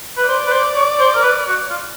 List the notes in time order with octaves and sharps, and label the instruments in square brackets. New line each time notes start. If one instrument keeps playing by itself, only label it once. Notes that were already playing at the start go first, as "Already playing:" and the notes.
[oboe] B4
[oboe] C5 [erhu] D5
[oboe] B4
C5
C#5
C5
A#4
B4
F#4
F4